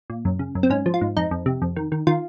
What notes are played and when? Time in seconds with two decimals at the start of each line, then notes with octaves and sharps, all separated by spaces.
0.10 A#2
0.25 F#2
0.39 C#3
0.55 F#2
0.63 C4
0.70 G#2 C#4
0.86 F3
0.94 F4
1.01 G#2
1.17 F2 D#4
1.31 F2
1.46 C3
1.62 F2
1.76 D#3
1.92 D#3
2.07 D#3 F4